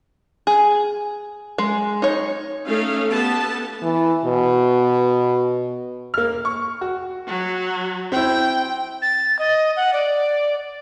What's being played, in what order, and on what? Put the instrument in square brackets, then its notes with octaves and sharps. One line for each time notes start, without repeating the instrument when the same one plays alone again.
[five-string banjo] G#4
G#3
D#4 C#5
[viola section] A3 C#4 D#4 F5
B3 G4 A4 A5
[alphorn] E3
B2
[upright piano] A#3 F6
C#6
F#4
[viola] F#3
[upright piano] C4 E4 [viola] G5
[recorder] A6
D#5
F#5
D5